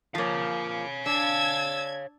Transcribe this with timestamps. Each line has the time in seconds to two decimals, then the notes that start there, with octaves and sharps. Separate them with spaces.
0.15 F3 A#3 C#5 F5
1.06 D4 E6 G#6 A6